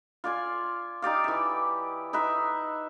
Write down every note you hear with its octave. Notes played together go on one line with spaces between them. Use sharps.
F4 D5 G#5
D#4 G4 D5 F5
E3 E5
D#4 B4 E5